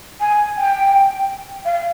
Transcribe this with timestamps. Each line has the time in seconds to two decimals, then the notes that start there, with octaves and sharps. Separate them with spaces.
0.21 G#5
0.57 G5
1.65 F5